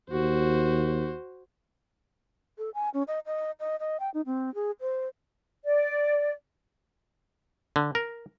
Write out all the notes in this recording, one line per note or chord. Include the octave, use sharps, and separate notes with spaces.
D#2 F#4 C5
A4
G#5
C#4
D#5
D#5
D#5
D#5
G5
D#4
C4
G#4
C5
D5
D3
A#4